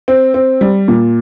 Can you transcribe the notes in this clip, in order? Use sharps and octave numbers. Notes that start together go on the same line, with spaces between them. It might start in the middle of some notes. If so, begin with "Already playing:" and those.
C4
C4
G3
A#2